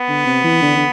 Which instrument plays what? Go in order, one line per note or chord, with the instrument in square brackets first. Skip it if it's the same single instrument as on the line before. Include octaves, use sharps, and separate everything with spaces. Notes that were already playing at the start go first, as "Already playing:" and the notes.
Already playing: [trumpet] B3
[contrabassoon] D3
C3
E3
D3
D3